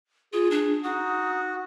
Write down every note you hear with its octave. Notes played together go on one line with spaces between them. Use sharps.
F4 G#4
D4
D#4 F#4 D#6